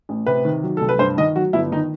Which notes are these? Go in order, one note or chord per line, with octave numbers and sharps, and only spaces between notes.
A1
C3 B4
D#3
F#3
C2 A4
B4
G2 C5
D#3 D#5
F#3 F#4
G1 E4
D#3 D#4